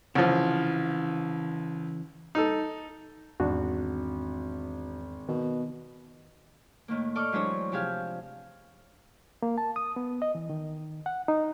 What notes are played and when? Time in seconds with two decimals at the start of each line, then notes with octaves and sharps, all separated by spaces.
0.15 C2 C#3 E3 F3
2.35 D#4 A4
3.40 G#1 E2 D4 F#4
5.28 B2 D#3
6.88 A2 D#3 A#3
7.15 A4 D5 D#5 C#6 D6 F6
7.32 E3 F#3 G#3 D4 C5 C#5
7.72 C3 F3 G4 G#4 F5
9.42 A#3
9.58 A5
9.76 D#6
9.96 B3
10.22 D#5
10.35 E3
10.50 D#3
11.06 F#5
11.28 D#4